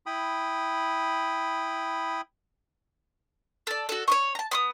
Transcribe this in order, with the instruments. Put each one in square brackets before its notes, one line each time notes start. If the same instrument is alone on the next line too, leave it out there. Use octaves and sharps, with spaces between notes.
[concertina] E4 G5 B5 D#6
[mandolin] A4 D5
F#4 A4
C#5 D#5 C#6
A5 A#5
B3 C6 D#6